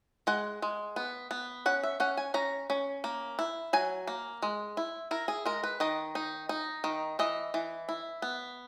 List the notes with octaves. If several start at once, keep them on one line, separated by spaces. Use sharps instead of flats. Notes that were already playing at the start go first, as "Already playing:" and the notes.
G#3 F#5
G#3
B3
B3
C#4 F#5
E5
C#4 F#5
G#5
C#4 A#5
C#4
A#3
E4
F#3 G#5
A#3
G#3
E4
E4 A#4
G#4
G#3 A#4
B4
D#3 D#5
D#4
D#4
D#3
E3 D#5
E3
E4
B3